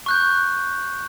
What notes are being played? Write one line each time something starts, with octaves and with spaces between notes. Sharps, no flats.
C#6 F#6 G6